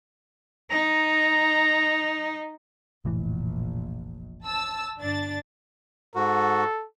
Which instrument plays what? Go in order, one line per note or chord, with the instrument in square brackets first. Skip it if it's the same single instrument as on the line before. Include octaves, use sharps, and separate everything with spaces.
[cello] D#4 [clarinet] A#5
[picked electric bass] F1 A2 E3 [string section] A#1
[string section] A5 E6
G1 D4 A6
[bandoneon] G#2 F#4 [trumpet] A4